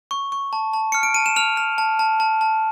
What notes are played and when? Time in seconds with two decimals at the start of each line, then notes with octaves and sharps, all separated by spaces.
0.11 C#6
0.32 C#6
0.53 A5
0.73 A5
0.92 F6 C#7
1.03 D7
1.14 A5 D#7
1.26 E7
1.36 F6 F7
1.57 F6
1.78 A5
1.99 A5
2.20 A5
2.41 A5